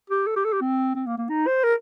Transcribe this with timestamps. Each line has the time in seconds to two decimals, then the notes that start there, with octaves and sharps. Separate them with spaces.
0.10 G4
0.27 A4
0.36 G4
0.45 A4
0.53 G4
0.61 C4
0.95 C4
1.07 A#3
1.18 A#3
1.29 D#4
1.47 C5
1.64 A#4